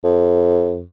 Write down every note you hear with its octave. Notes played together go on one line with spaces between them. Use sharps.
F2